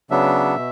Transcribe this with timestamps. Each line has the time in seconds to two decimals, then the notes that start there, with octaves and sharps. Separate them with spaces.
0.11 C#3 F#3 B3 D4 E5
0.56 B2